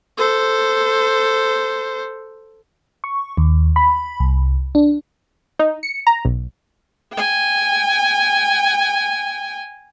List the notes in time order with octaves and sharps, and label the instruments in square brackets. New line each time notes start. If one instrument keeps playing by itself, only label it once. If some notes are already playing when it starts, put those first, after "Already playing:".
[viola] A4 C5
[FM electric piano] C#6
D#2
B5
C2
D4
[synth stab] D#4
C#7
A#5
B1
[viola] G5 G#5